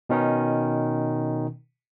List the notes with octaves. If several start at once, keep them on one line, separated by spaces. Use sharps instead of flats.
B2 D#3 C#4 D#4